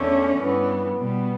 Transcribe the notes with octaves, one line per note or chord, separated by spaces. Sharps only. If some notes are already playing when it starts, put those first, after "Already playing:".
Already playing: E2 D3 A3 C#4
G2 E3 B3
B2 G3 B3